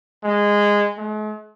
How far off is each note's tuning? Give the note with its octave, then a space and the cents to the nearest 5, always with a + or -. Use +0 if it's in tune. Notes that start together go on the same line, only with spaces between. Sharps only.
G#3 -15
G#3 +45